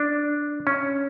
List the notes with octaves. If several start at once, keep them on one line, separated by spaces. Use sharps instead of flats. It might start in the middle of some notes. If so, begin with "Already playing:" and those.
Already playing: D4
C#4